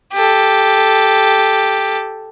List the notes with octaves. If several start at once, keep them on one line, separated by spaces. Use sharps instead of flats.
G4 A4